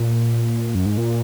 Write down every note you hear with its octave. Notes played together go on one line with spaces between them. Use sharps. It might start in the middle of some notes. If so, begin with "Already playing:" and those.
Already playing: A#2
F#2
G#2
A#2